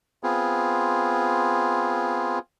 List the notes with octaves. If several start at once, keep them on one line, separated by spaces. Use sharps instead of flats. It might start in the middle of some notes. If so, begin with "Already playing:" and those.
B3 C4 F4 G#4